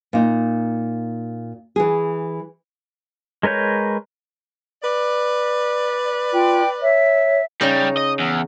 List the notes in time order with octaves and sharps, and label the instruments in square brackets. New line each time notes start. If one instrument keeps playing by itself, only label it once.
[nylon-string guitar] A#2 D#4
E3 G#4
[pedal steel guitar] G#3 A#4 B4 C#5 G6
[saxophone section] B4 D5
[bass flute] F4 [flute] G5
[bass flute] C#5 [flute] E5
[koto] C#3 D#4 [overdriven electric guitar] G3
[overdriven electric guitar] D#5
E2